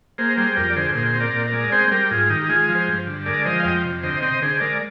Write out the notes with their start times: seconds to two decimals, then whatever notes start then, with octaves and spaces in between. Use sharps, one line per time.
0.18 A#3 G#4 C5
0.37 G3 G#4 C5
0.56 F2 G4 A#4
0.70 D5
0.76 D3 G#4 C5
0.95 A#2 G#4 C5
1.15 C4
1.20 A#4 D5
1.34 A#2
1.46 A#4 D5
1.53 G#3
1.72 C4 G#4 C5
1.91 G3 G4 A#4
2.11 G#2 F4 G#4
2.30 D#3 D#4 G4
2.42 G4
2.49 G#3 F4 G#4
2.68 F3
2.75 G#4 C5
2.88 G2
3.07 D3
3.26 G#3 A#4 D5
3.45 F3 C5 D#5
3.60 F5
3.64 F2 D#5 G5
3.84 C3
4.03 D3 C5 D#5
4.22 C4 C5 D#5
4.42 D3 G#4 C5
4.61 G#3 A#4 D5